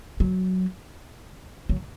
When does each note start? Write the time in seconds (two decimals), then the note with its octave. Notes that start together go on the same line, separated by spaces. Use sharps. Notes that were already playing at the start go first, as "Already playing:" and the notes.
0.20 F#3
1.69 F#3